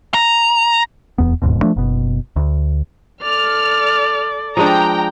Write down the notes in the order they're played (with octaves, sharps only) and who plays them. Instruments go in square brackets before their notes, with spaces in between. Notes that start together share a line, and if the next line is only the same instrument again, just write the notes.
[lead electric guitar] A#5
[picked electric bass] D#1 E2 B3
D1 D#2 G#2 B2
F3 A3 D4
F#1 B2
D2
[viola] A4 D5 [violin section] F6
[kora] F3 G#3 D4 [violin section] G5 A#5